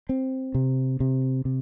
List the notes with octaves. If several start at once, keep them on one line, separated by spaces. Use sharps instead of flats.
C4
C3
C3
C3